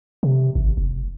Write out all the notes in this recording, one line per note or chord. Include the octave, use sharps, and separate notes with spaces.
C3
G#1
F1